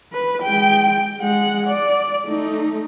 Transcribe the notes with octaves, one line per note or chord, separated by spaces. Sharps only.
B4
G#3 G5
G#3 F#5
D5
A3 D#4